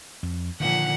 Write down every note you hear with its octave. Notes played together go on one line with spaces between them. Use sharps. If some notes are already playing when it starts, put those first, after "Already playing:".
F2
A#2 D3 D#3 F3 F#5